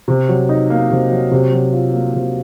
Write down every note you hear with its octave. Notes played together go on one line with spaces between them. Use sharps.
C3
F#3
D#4
A#3
C3
F#3
C3
F#3
F4
A#3
C3